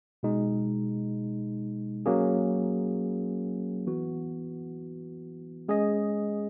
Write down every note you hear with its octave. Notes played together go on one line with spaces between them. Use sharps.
B2 G#3 D#4
F#3 A#3 C#4 G#4
E3 B3 F#4
G#3 C#4 G#4 D#5